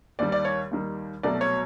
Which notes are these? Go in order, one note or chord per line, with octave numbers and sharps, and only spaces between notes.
D#2 D#3 G3 D5
D5
C#5
D#2 D#3 G3
C2 B2 F#3 A3 D5
C#5